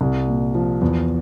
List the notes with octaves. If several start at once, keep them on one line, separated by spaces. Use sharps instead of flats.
C2
A#2
F3
E2